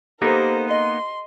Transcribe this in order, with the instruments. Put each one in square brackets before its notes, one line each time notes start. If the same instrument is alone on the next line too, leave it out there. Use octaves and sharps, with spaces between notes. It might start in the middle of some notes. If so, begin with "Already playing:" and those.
[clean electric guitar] A#3 B3 D#4 [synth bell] G4 A4 [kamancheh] A#4 C5
[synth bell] D#5 [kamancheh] C6